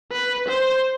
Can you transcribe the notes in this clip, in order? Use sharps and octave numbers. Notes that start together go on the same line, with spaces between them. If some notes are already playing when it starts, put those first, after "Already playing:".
B4
C5